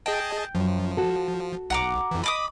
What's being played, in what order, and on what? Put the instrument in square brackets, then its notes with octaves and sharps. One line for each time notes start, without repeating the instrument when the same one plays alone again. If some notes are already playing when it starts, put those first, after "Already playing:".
[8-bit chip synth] G#4 D#5 A5 [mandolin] G5
[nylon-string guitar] F#2 [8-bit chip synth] F3
[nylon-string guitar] F#4 A4
[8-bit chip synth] B1 [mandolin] F#5 A#5 D6
[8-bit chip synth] F2 E3
[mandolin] D#5 D6 D#6 [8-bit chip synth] B5